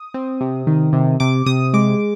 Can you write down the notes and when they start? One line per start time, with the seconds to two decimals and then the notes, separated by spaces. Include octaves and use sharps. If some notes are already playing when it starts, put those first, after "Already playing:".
Already playing: D#6
0.14 C4
0.41 C3
0.67 D#3
0.93 C3
1.20 C3 D6
1.46 C3 D#6
1.74 G#3 D6